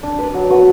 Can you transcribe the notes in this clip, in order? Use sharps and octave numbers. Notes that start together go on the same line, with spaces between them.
D4
B4 D5
F#3
B3 F#4 B4